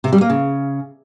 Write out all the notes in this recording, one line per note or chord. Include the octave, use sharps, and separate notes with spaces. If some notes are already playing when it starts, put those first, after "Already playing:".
C3
G3
A#3
C#3